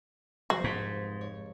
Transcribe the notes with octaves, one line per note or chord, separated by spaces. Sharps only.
F1 G#3 F#4 C5
G#2 B6
C#5